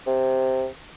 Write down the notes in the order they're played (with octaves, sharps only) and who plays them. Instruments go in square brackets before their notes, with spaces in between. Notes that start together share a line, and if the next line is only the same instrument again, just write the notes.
[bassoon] C3